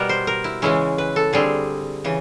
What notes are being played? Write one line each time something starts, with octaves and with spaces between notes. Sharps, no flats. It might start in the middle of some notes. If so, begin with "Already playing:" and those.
Already playing: B2 G3 B3 A#4
C5
A#4
E4
C#3 E3 G#3 C#4 E4
B4
A4
D3 G3 C4 G#4
C#3 E3